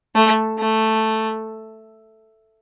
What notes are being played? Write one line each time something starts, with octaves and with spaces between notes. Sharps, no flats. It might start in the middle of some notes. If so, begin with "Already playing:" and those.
A3
A3